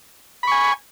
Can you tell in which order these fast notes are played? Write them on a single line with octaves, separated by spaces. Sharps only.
B5 C#6 G#5